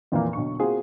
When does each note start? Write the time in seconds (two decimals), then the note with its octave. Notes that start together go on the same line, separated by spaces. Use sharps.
0.12 F2 A#2 E3 A#3
0.33 B1 D3 C#6
0.60 A#3 C4 F4 F#4 G#4